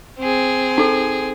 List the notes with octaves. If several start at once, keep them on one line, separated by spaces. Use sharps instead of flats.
C4 G#4
D#4 A4